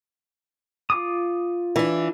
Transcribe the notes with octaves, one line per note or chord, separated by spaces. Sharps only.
F4 D6 D#6
E3 D4